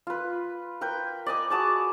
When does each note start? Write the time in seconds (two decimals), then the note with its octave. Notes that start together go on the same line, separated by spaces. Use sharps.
0.07 F4 B4
0.81 A#4 B4 G5
1.26 D5 D#5 G#5
1.50 F#4 G#4 A5 D6